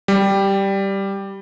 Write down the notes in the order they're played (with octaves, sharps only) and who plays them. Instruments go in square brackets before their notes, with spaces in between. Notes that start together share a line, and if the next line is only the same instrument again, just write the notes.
[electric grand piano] G3